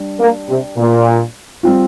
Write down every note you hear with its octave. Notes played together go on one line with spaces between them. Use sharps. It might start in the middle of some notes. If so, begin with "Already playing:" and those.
Already playing: G3 D4
A#3
C3
A#2
G3 C4 F4